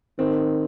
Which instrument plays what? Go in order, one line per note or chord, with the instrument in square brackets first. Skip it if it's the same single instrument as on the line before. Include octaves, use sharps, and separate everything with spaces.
[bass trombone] D#3 [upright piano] C4